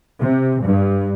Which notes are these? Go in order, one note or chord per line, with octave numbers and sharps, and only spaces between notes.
C3
G2